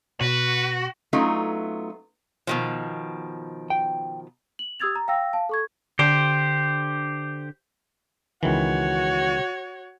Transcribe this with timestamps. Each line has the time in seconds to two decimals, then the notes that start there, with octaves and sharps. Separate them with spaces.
0.21 B2 F#4 B4
1.13 F#3 A3 B3 C#4 D#4 F4
2.47 B2 D#3 F3
3.70 G5
4.59 F#7
4.80 G4 D#6 E6 G#6 A6 F7
4.96 A#5
5.08 F5 G5 E6 A#6
5.33 F5 A5
5.49 A4 C#6 G#6
5.99 D3 G4 C5
8.43 C#2 D#3 E3 F#4 C#5